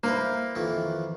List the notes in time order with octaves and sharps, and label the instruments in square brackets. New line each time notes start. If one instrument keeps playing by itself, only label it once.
[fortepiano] A#3 [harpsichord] E4 B4 C5
[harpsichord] F2 D#3 E3